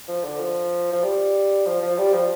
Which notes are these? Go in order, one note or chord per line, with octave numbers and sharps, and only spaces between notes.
F3
D3
F3
F3
G3
F3
F3
G3
F3